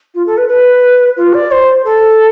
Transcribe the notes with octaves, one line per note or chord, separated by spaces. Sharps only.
F4
A4
B4
B4
F4
D5
C5
A4